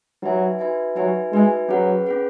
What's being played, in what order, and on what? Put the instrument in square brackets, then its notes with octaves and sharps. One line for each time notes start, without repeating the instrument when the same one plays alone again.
[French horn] F#3 [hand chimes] D#4 F#4 B4 E5 G#5
[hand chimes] D#4 F#4 B4 E5 G#5
[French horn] F#3 [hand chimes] D#4 F#4 B4 E5 G#5
[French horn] G#3 [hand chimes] D#4 F#4 B4 E5 G#5
[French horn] F#3 [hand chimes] C#4 G#4 B4 F#5
[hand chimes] C#4 G#4 B4 F#5